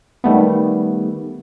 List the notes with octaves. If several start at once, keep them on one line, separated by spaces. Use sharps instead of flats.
D#3 G3 A3 B3